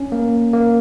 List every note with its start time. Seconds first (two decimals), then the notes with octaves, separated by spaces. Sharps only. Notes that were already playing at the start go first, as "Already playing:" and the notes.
Already playing: C#4
0.12 A#3
0.53 A#3